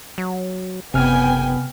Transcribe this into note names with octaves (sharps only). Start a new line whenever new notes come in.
F#3
F#1 C3 B3 G5 G#5 F6